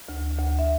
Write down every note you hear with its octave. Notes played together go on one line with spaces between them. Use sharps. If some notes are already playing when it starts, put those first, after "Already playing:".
D2
D2
E5